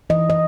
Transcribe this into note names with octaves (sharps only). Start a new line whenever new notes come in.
E3 D#5
D#5